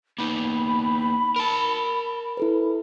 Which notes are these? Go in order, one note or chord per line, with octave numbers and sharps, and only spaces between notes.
A#3 B3 D#4 B5
A#4 A5
E4 A4 B4